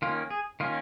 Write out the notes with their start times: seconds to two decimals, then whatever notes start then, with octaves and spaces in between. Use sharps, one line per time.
0.02 D#3 A#3 C#4 F4
0.30 G#4
0.60 D#3 A#3 C#4 F4